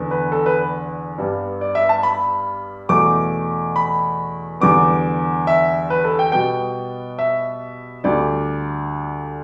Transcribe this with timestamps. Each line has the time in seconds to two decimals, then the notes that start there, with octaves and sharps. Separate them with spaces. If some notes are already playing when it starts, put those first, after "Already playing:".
Already playing: E2 D3 B3
0.11 B4
0.32 A4
0.46 B4
1.18 G2 G3 B3
1.61 D5
1.75 E5
1.89 A5
2.03 B5
2.89 E2 B2 A3 D6
3.76 B5
4.60 E2 D3 G3 B3 D6
5.47 E5
5.90 B4
6.04 A4
6.19 G5
6.32 B2 G3 B3 G5
7.19 E5
8.04 D2 D3 G3 D5